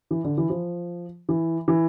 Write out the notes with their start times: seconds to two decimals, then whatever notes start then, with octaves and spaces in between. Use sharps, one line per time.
0.11 E3
0.24 D3
0.38 E3
0.50 F3
1.29 E3
1.68 E3